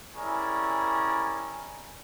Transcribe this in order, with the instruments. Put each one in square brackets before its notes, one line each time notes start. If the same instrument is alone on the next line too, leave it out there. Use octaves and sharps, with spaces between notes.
[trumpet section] G3 C#4 E4 G#4 A#4 D5